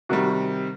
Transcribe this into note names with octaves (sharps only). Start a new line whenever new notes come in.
C3 D#3 G3 F#4